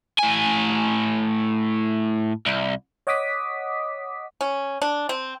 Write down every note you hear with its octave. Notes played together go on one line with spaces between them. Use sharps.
A2 G#5
C2
C#5 D#5 F#5 D6 D#6 B6
C#4
D4
C4